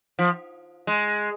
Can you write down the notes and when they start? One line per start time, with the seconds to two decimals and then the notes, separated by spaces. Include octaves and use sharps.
0.19 F3
0.87 G#3